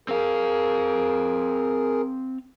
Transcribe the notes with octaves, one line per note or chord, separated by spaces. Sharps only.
C4 G#4 A#4 F5